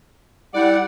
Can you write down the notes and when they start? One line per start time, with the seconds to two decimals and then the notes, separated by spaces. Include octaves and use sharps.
0.54 G3 E4 D5 F#5